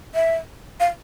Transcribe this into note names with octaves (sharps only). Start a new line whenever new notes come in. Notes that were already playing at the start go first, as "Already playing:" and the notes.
E5
F5